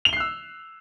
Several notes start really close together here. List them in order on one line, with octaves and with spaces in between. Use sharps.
F7 G7 C7 F#6 E6